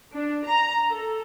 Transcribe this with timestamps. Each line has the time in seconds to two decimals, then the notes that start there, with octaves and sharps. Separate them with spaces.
0.12 D4
0.45 A#5
0.89 A4